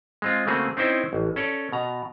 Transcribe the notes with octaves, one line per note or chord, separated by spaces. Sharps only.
G#3 C4 F4
C#3 A3 A#3 C4 F#4 G#4
C4 C#4 D#4 E4 C5 G5
A1
C#4 A4 C#5 D5
B2 A#5